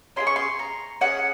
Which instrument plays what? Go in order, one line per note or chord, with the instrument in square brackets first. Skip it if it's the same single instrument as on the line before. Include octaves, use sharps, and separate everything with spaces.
[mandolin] C#4 E4 G#4 C6
C#6
C6
A#5
C#4 E4 G#4 F#5